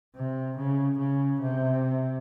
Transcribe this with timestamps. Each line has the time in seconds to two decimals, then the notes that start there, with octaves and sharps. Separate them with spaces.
0.15 C3
0.57 C#3
0.98 C#3
1.40 C3